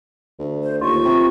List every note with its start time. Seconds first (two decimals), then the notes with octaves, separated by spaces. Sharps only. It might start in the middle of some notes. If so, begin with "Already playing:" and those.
0.39 D2
0.63 C5
0.81 D#2 F4 C#6
1.05 C3